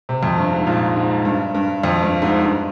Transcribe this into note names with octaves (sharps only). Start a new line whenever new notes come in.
C3
F2
G2
G#2
A#2
G#2
G2
G2
F2
G2
G#2
G2